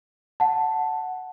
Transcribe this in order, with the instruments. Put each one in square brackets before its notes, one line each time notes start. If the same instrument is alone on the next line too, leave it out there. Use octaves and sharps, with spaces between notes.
[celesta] F#5 A5